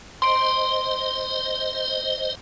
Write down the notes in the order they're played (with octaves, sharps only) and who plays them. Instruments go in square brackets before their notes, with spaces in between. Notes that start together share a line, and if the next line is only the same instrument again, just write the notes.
[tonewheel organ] C5 D#5 [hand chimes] C6 D7